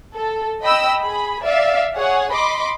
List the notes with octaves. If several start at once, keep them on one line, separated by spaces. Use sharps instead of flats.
A4
D#5 G5 B5 E6
G#4 B5
D5 E5 F5
G#4 C#5 F#5
D#5 B5 C6 D6